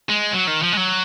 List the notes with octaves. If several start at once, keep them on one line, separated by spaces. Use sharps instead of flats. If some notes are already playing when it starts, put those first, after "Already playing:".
G#3
F#3
D#3
F3
G#3
F#3